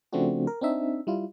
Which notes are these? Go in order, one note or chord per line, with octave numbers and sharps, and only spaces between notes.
C#3 F3 A3 C4 D4 F#4
A#4
C4 D4 D#4 E5
G3 E4 F4